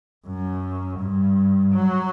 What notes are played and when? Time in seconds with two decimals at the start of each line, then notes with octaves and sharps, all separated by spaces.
0.27 F#2
1.00 G2
1.72 F#3